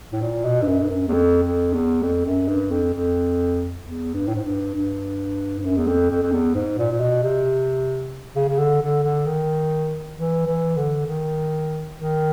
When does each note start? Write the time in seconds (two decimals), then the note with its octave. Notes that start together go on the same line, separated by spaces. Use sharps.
0.12 A2
0.21 A#2
0.45 B2
0.62 G2
0.67 F#2
0.81 G2
0.89 F#2
1.08 E2
1.13 F2
1.43 F2
1.73 E2
2.02 F2
2.25 F#2
2.48 G2
2.71 F2
2.93 F2
3.84 E2
4.14 G2
4.28 A2
4.35 G#2
4.44 G2
4.75 G2
5.59 G2
5.64 F#2
5.78 E2
5.87 F2
6.10 F2
6.22 F2
6.32 E2
6.55 G#2
6.78 A#2
6.92 A#2
7.00 B2
7.23 C3
8.35 C#3
8.48 C#3
8.58 D3
8.81 D3
9.03 D3
9.26 D#3
10.17 E3
10.47 E3
10.76 D3
11.07 D#3
11.97 D#3